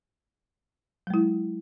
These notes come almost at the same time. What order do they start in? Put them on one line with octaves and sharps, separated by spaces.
F#3 G#3 E4